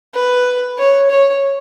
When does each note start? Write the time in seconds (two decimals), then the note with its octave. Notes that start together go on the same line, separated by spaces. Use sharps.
0.14 B4
0.78 C#5
1.10 C#5